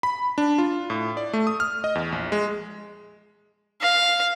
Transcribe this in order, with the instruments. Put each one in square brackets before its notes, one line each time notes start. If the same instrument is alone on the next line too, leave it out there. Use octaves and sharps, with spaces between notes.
[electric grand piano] B5
D4
F4
A2
D5
A3
D#6
F6
D#5
E2
A#1
G#3
[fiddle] F5